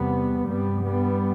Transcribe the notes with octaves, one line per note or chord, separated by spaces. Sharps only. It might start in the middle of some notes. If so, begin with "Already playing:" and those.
Already playing: E2 C3 G3 B3
G2 G3 B3
G3 B3